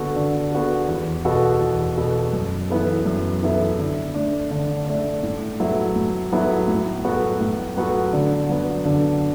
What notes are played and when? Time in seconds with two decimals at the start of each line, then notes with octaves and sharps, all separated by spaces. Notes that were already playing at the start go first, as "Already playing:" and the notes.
Already playing: D3 B3 F#4 A4
0.16 D3
0.52 B3 F#4 A4
0.89 E2
1.25 B2 B3 F#4 A4
1.61 E2
1.97 B2 B3 F#4 A4
2.33 F#2
2.70 E3 B3 E4 A4
3.06 F#2
3.42 E3 B3 E4 A4
3.79 D3
4.14 A3 D4
4.51 D3
4.87 A3 D4
5.23 A2
5.60 F#3 B3 E4 A4
5.96 A2
6.32 F#3 B3 E4 A4
6.68 A2
7.04 F#3 B3 F#4 A4
7.40 A2
7.77 F#3 B3 F#4 A4
8.13 D3
8.49 F#3 B3
8.85 D3